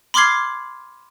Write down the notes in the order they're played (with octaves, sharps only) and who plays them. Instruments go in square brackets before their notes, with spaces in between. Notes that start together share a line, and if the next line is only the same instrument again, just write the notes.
[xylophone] B5 C6 D6 F6 G#6 C7